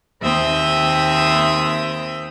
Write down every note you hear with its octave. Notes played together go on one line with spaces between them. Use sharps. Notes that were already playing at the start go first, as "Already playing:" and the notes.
D#2 C4 E5 G5 D#6